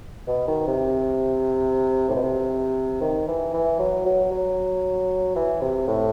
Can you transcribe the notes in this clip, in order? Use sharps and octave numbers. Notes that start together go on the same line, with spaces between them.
B2
D#3
C3
A2
B2
C3
D#3
E3
E3
F#3
F#3
F#3
E3
C3
A2